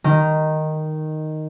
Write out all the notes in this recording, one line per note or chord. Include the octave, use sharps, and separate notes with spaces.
D#3